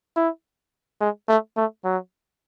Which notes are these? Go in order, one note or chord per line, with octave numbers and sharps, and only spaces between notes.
E4
G#3
A3
A3
F#3